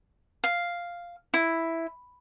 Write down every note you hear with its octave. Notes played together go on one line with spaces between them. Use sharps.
F5
E4